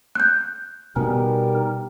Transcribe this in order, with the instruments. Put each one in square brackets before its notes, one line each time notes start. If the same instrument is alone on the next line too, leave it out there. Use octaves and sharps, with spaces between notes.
[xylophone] F#6 G6
[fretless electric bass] B2 B3 [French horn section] G3 G4 [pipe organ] D#4 A#4 [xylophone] G#5